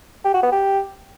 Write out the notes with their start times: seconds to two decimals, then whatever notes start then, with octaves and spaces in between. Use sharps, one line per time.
0.24 G4
0.34 F#4
0.43 B3
0.52 G4